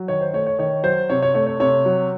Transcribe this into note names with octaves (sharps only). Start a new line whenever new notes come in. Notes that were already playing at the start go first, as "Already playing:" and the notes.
Already playing: F#3
D#3 C#5
C5
A3 C#5
C#5
D#3 C#5
F#3 C5
C3 C#5
C#5
A3 C#5
C#5
C3 C#5
F#3